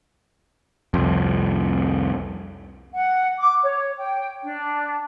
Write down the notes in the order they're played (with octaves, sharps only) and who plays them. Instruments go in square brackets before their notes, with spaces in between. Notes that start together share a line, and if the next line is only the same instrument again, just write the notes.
[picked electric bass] C2 F2
[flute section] F#5
D6
C#5
G5
D4